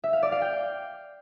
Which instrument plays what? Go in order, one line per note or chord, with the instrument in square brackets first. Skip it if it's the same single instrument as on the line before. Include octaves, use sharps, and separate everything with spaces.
[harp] E5
F5
D5
F5
G5